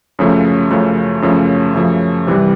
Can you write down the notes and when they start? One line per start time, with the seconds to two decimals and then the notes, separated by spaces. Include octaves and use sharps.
0.19 F#2 C#3 F3 A3
0.70 F#2 C#3 F3 A3
1.22 F#2 C#3 F3 A3
1.74 F#2 C#3 F3 A3
2.27 C3 E3 G3